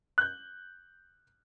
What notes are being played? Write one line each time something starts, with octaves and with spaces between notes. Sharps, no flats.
F#6 G6